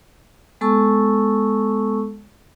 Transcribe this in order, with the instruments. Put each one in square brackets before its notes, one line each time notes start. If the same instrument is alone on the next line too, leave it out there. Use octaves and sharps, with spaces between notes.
[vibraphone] G#3 B3 A4 A5 C#6 E6